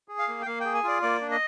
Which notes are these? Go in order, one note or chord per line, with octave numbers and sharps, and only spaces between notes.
G#4
F5
A#3
G5
A#3 F5
G#4 G5
G#5
F4 D5
A#3 D5
D4
D#5